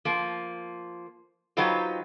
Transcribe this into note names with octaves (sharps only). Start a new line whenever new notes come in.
F3 A#3
F#3 D#4 F4 G4 B4 C5